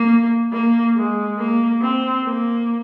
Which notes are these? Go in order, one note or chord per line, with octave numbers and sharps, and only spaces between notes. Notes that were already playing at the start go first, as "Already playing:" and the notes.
Already playing: A#3
A#3
G#3
A#3
C4
A#3